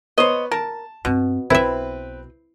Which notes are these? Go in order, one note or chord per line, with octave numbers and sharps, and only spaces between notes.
B3 C5 C#5 D#5
A#4 A5
G2 B2 C4
B1 C4 E4 B4 E5